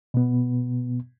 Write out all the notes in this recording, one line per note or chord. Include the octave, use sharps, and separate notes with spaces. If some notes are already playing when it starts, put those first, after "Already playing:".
B2 B3